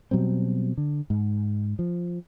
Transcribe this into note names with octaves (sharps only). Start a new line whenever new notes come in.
B2 F#3 G3 C4
D3
G#2
F3